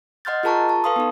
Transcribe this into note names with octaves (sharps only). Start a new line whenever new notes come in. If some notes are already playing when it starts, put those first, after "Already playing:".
D#5 F#5 C6 F6 G6 A6
F4 G#4 A#4 A5 A#5 C#6
A5 C#6
A4 B4 F5 C6 D#6
B3 D#4 A4